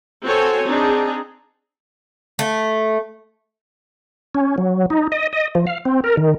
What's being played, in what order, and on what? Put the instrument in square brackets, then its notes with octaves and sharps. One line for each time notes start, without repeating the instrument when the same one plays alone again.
[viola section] C4 F#4 A4 C5 C#5 G#5
C4 D4 D#4 G#4
[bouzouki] A3
[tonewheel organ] C#4
F#3
D#4
D#5
D#5
F3
F5
C4
A#4
D#3